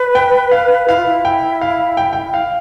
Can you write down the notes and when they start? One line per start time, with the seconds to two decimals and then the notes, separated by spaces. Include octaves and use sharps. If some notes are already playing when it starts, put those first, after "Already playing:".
Already playing: B4
0.15 G5
0.52 F5
0.88 E4 F5
0.97 F4
1.06 E4
1.25 G5
1.61 F5
1.97 G5
2.13 G5
2.34 F5